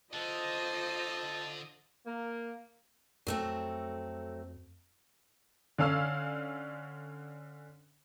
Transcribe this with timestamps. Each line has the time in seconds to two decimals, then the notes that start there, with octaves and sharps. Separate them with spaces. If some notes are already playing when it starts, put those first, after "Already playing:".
0.13 D3 F4 C5 D#5 A5
2.06 A#3
3.27 F2 F#3 A3 C4
5.78 D3 C#4 F5 E6 F6